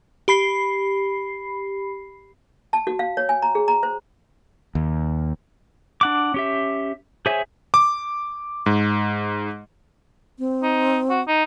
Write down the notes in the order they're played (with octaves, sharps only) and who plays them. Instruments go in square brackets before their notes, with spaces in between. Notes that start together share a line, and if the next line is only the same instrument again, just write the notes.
[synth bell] G4 B5 C7
[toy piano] A5
F#4
F5
C#5
G#5
A#5
G#4
A#5
C5
[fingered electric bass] D#2
[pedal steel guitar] D4 F#5 D6
C#4 G4 E5
G#4 C5 C#5 E5 G#5
[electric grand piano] D6
G#2
[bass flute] C4
[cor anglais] D#4
F#4
D#4